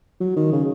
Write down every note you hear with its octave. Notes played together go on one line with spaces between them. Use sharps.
F#3
D#3
C#3